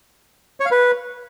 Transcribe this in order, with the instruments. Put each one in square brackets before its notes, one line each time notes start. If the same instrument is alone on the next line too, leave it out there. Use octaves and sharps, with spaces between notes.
[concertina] C#5
F5
B4